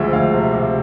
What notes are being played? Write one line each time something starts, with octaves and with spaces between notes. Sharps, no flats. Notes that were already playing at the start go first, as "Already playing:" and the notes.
Already playing: D2 F3 G#3 E5
D2 F5
C3
C3